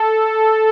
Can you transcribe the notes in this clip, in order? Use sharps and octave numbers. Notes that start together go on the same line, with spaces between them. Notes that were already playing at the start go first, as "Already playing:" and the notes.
Already playing: A4